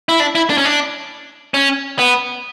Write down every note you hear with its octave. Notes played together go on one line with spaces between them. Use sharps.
E4
D4
E4
D4
C#4
D4
C#4
B3